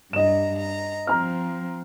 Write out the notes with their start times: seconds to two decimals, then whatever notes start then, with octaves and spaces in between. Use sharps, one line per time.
0.13 G2 D#5 A#5 E7
0.58 A#5
1.07 F3 C4 A#5 F6